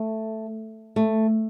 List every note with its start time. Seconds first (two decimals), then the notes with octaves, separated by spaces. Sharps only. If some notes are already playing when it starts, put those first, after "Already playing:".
Already playing: A3
0.96 A3